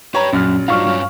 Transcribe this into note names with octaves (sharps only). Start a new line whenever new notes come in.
G4 B4 C#5 A#5
A#1 F#2 F#3 C#4 F6
G2 F#3 D4 D#4 F4 F5 C#6 F6
G2 C#4